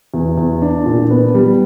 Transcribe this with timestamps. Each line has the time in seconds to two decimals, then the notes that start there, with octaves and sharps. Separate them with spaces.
0.14 E2
0.38 E2
0.62 D4
0.86 A#2
1.10 B3
1.34 G3